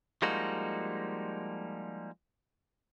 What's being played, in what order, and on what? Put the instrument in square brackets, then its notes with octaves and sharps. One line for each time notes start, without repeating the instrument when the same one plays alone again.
[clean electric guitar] F3 G3 G#3 A#3 D#4 F#4